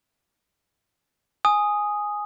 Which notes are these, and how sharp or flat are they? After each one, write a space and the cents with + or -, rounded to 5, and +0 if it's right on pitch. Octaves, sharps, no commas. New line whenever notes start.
G#5 +0 D#6 +0